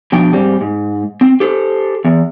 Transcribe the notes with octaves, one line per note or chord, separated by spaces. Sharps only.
B2 F3 D4 G5
G#2 G3 C4
G#2
C4
G4 A4 C5
E2